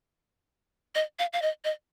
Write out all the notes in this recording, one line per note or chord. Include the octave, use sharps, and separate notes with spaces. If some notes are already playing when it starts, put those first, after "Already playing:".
D#5
F5
F5
D#5
D#5